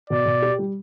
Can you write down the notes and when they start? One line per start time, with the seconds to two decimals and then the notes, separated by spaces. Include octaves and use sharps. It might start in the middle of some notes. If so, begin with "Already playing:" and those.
0.10 B2 D5
0.25 B2
0.42 G4
0.59 G3